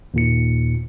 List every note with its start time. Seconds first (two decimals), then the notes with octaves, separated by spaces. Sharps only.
0.14 D#2 A#2 C#7